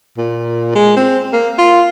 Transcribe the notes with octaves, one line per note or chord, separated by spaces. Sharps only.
A#2
G#3
C4
A#3
F4